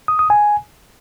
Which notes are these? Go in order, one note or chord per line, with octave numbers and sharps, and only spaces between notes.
D#6
D#6
G#5